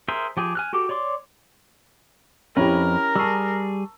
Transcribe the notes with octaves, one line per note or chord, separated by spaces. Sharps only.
G#4 A#4 C5 E5
F3 G4 G#4
G#5 F6 F#6
F#4 G4 A4 D6
C#5 D5 C6 D6
F2 C#4 E4 G4 A#4 B4
G3 G#4 A5 C#6 E6